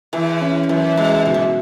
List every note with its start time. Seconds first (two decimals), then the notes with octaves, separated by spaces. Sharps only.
0.13 E2 E3
0.41 C#4
0.69 F#2 E3
0.97 B2 G#3
1.26 G#2 B2
1.34 F#2